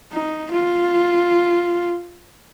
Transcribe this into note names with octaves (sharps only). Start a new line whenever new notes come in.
D#4
F4